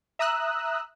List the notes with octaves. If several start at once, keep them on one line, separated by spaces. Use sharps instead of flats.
E5 A#5 D#6 E6 F#6